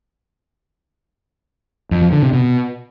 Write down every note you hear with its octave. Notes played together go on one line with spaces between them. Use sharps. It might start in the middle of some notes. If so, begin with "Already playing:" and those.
F2
F3
D3
C3
B2